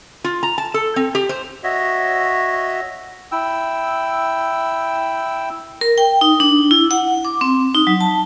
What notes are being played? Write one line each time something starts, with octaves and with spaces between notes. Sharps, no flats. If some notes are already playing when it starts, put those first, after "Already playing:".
F4
A#5
A5
A4
C4
G4
C5
F#4 C#5 D#5 E5
E4 G5 E6
A#4
G5
D#4
D4
E4
F#5
D6
C4
D#4
F#3
A5